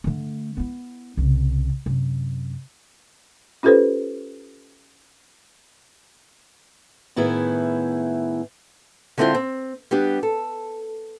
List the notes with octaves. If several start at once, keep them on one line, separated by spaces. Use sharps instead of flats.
D3 A3
B3 E4
C2 C#3
F#2 C3
C#4 F4 G4 A4 B4 C5
A2 D#3 B3 E4 G#4
D3 G#3 C4 E4 F4 C5
C4
G3 B3 D4 G4
A4